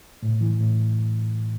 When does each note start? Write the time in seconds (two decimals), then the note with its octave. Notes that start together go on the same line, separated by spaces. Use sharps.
0.23 A2
0.41 E3
0.60 A2